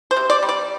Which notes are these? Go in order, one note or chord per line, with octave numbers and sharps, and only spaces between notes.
C5
C3
D5
G3
D5